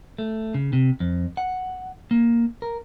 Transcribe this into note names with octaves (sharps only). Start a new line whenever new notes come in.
A3
C#3
C3
F2
F#5
A#3
A#4